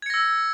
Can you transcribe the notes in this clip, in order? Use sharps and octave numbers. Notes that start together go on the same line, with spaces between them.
E6 G#6 A#6 C#7